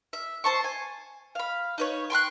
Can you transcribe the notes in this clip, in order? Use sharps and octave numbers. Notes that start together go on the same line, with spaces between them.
E5
C5 A5 C#6
G#5
F5 B5
D#4 B4 C#5
G5 C6 C#6 F#6